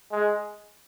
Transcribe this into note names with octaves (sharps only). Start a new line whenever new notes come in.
G#3